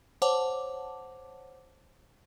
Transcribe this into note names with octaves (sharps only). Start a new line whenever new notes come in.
C5 C#5 F#5 A5 D6